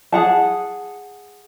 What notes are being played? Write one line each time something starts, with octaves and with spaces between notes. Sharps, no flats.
G#4 F#5 A5